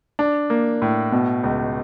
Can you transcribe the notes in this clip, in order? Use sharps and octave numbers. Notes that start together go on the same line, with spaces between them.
D4
A#3
A2
B2
C#2